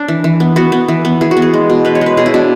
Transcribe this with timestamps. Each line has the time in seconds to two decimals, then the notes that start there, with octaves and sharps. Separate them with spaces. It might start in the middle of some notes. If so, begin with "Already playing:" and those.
Already playing: D4
0.08 E3
0.24 E3
0.40 B3
0.56 B3 F#4
0.72 B3
0.88 E3
1.05 B3
1.21 E3 G#4
1.31 F#4
1.37 B3
1.42 G#4
1.54 G#3
1.70 B2
1.85 G#3 B4
1.95 C#5
2.01 G#3 B4
2.17 B2 G#4
2.26 E4
2.34 B2 D4